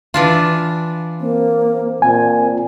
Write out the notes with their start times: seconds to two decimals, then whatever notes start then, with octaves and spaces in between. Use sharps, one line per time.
0.14 E3 D4 F4
1.21 A#3 C4
2.02 A#2 C4 G#5